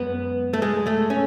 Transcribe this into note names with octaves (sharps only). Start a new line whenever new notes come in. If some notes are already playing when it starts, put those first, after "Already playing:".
Already playing: F#2 G#3 B3
A3
G#3
A3
C#4